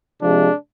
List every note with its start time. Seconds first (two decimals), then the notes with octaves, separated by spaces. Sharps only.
0.22 C3 F3 G#3 D4